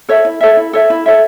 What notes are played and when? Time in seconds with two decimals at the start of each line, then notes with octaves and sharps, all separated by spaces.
0.09 A4 C#5 E5
0.25 E4
0.41 A4 C#5 E5
0.57 E4
0.73 A4 C#5 E5
0.90 E4
1.06 A4 C#5 E5